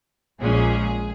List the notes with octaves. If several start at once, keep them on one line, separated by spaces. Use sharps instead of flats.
A#1 A#2 G#3 C#4 G#4